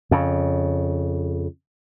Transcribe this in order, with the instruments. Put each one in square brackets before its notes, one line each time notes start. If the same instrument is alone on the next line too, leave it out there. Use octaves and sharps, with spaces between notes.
[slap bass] F2 C#3